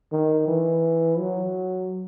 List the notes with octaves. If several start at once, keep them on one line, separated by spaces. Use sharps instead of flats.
D#3
E3
F#3